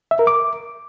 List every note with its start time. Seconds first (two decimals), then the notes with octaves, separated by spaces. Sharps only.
0.11 E5
0.19 A#4
0.27 D6